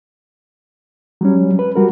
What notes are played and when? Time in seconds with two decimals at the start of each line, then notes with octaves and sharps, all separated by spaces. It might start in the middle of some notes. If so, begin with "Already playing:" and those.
1.21 F#3 G3 C#4
1.59 B4
1.76 G3 F#4 A#4